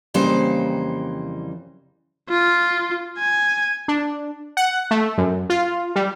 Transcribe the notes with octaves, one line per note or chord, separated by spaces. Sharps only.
F2 C#3 E3 G3 A#3 C5
F4
G#5
D4
F#5
A3
F#2
F4
G3